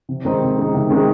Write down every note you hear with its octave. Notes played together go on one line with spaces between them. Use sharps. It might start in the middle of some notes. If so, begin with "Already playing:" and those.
C3
D#3 G#3 C4 D#4
C3
D#3 G#3 C4 D#4
C3
D#3 G#3 C4 D#4